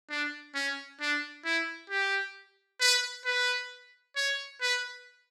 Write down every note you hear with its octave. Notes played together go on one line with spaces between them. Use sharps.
D4
C#4
D4
E4
G4
B4
B4
C#5
B4